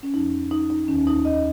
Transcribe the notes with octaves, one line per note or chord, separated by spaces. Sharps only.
C#4
F2 F3 D#4
D#4
D#4
D#2 D#3 C#4
D#4
D#5